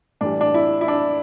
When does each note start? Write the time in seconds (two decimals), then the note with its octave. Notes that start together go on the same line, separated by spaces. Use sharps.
0.21 A2 E3 G3 D4
0.41 D4
0.54 E4
0.81 E4
0.88 D4